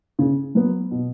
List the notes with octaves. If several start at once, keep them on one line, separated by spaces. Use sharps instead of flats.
C#3
F#3 B3
B2